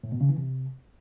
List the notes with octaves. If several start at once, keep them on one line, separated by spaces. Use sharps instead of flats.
A2
B2
C#3
E3
C3